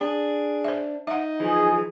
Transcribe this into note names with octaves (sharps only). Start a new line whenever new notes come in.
D4 G#4
C5 E5
D#4 E5 F#5
E3 F3 G#4